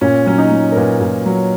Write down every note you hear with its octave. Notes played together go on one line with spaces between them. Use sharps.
A#2 C#4
F#3 C#4
D#4
F#3
A#4
A#2 B4
A#2
F#3